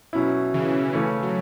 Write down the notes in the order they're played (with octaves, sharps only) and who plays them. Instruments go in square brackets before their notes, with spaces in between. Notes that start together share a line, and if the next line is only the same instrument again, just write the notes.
[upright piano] B2 F#3 C#4 E4
[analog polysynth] C#3 E3
[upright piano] C#3 E3 A3 C#4
[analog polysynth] F#3